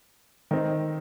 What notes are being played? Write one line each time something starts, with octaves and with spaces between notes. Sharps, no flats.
D#3 C4 D#4